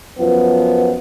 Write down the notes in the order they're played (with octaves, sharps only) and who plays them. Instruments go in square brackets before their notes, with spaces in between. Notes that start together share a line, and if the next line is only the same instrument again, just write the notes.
[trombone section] F#2 F3 B3